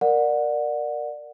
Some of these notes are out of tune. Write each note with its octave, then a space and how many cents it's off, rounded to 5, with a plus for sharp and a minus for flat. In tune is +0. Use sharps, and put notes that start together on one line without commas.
A#4 +0 D5 +15 F#5 -20